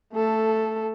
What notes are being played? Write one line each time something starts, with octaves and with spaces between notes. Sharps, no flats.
A3 A4